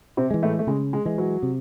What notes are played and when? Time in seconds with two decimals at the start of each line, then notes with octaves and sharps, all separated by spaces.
0.17 C3 C4
0.31 E3 G#3
0.43 A2 A3
0.59 A3
0.67 C#3 G#3
0.93 G#3
1.05 E3 G#3
1.18 F#3
1.43 C3